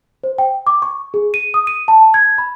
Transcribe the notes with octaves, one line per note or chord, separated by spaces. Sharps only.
C5
G5
D6
C#6
G#4
D#7
D#6
D#7
A5
G#6
B5